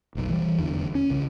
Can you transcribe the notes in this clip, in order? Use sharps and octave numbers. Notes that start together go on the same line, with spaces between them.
F1 B1
E3 G3
F1 E2 D3
C#4
C2 C#3